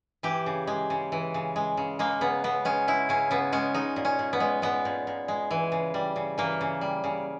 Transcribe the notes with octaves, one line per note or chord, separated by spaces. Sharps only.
E3 G4
C#3
G#3
C#3
E3
C#3
G#3
C#3
G#3 A#3
C#3 B3
C#3 B3
G#3 C#4
G#3 E4
C#3 C#4
C#3 B3
G#3 C#4
G#3 D#4
A#2
C#4
A#2
B3
G#3
G#3 B3
A#2
A#2
G#3
E3
C#3
G3
C#3
E3 A#3
C#3
G3
C#3